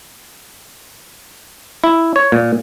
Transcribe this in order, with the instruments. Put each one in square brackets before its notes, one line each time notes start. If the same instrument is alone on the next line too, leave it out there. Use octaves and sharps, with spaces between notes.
[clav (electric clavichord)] E4
C#5
A#2